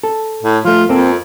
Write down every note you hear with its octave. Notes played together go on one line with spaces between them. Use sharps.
A4
A2
F3 A3 F4
F2 A#3 C4 A4